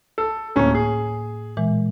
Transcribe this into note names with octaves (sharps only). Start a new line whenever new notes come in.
A4
D1 A2 A#3 C#4
G#4
A#2 E3 G#3